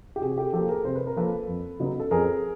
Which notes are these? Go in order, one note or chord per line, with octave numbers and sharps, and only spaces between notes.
G4
C3 F#4 G#4
G4 A4
F3 A#3 G4 A4
G#4 A#4
C3 C5
B4
A#4
F3 A#3 A4 B4
F2
C#3 F#3 B3 D#4
A4
F2 G#4 A#4